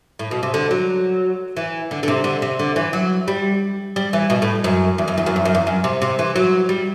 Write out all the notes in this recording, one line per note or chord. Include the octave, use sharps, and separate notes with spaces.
A2
B2
C3
D3
F#3
E3
D3
D3
C3
D3
C3
D3
E3
F#3
G3
G3
E3
B2
A2
F#2
E2
F#2
E2
F#2
E2
F#2
E2
F#2
C3
C3
E3
F#3
G3